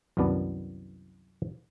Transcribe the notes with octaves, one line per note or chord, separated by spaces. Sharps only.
C2 F#2 D#3 B3 D5 A5